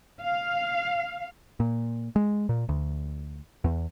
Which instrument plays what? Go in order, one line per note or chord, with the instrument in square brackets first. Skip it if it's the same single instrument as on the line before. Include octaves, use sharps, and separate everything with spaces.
[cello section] F5
[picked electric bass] A#2
G#3
A#2
D2
E2